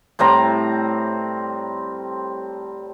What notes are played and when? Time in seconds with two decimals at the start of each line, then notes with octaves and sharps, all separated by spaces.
0.19 A2 G3 C4 A#5